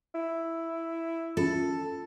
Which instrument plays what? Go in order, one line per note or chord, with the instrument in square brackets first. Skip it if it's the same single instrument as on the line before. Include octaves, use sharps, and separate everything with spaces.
[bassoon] E4
[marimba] C#4 F4 [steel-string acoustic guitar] A4